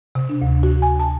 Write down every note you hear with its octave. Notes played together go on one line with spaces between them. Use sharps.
C3
D4
D2
F#4
G#5
A5